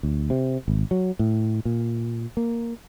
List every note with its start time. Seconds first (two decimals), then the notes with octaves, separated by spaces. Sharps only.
0.03 D2
0.30 C3
0.68 G#1
0.91 F#3
1.19 A2
1.65 A#2
2.37 A#3